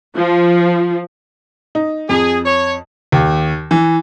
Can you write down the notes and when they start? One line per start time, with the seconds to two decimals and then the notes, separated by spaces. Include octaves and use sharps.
0.16 F3
1.75 D#4
2.09 F2 G#4
2.45 C#5
3.12 D#2
3.71 E3